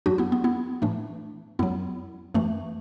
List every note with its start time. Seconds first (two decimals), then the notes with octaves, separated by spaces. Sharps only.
0.06 F#2 F#3 D4 F#4
0.18 B3 E4
0.32 B3
0.44 B3 E4
0.82 A2 E3 A3 D4
1.59 F#2 F#3 B3 E4
2.34 F#2 E3 A3